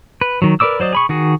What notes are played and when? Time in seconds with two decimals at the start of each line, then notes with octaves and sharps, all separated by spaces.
0.21 B4
0.42 D#3 F#3
0.60 A#4 B4 D5 D6 E6
0.80 F#3 C5 D5 D#5
0.93 G#4 B5 C#6
1.09 D#3 F#4 G#4